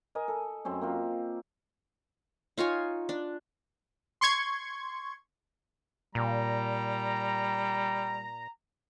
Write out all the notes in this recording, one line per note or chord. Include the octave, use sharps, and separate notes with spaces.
A#4 D#5 G#5
A4
F#2 F#3 C4 C#4
A#3 C4 F4
D#4 F4 C#5 G#5
D4
C6 C#6 G#6
A#2 G3 A#5